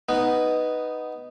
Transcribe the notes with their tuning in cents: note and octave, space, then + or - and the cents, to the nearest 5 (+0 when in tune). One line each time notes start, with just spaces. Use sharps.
B3 +0 D#4 +0